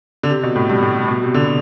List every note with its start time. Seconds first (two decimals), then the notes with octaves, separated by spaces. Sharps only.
0.23 D3
0.30 C3
0.43 B2
0.56 A2
0.70 G2
0.82 A2
1.08 B2
1.22 C3
1.34 D3